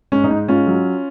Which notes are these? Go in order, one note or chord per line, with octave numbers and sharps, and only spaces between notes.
G#2 C#4
D#4
G#2
G#2 C#4 F4
F#3